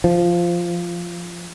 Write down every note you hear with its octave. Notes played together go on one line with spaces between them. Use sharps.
F3